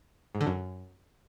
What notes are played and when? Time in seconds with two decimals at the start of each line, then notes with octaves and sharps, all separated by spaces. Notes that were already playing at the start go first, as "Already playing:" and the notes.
0.35 G#2
0.41 D3
0.47 F#2